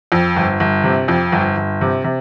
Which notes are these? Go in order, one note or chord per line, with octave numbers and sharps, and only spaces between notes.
F2
G1
G1
C3
F2
G1
G1
C3
C3